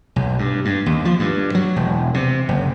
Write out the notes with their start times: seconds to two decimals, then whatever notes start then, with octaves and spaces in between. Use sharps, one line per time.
0.16 B1
0.39 G2
0.65 G2
0.86 D#2
1.05 F3
1.19 G2
1.55 F#3
1.76 E1
2.14 C3
2.49 F#1